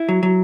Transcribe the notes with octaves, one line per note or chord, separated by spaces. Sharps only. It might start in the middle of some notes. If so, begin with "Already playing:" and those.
Already playing: E4
F#3
F#3